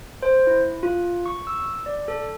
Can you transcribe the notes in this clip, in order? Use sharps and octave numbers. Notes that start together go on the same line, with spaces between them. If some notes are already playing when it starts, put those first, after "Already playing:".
C5
E4
F4
C#6
E6
D5
A4